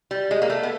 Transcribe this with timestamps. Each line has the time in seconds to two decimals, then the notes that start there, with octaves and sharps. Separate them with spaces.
0.11 G3
0.31 G#3
0.42 A#3
0.50 A3
0.63 B3